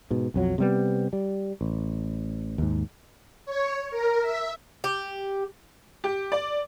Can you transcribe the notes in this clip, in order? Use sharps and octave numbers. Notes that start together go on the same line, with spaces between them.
G#2 B2
B1 F2 F#3
C3 G3 B3
G3
A1
D#2 G#2
C#5
A#4
E5
G4
G4
D5